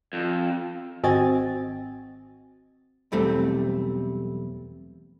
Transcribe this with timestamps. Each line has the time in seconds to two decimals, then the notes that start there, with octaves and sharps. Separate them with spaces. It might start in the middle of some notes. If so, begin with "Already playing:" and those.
0.13 F2
1.03 G#1 C4 F#4 D#5 G#5 A6
3.12 B1 E2 G3 A3 C4